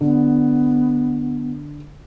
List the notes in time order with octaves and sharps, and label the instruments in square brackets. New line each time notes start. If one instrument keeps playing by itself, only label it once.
[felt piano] D3 [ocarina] B3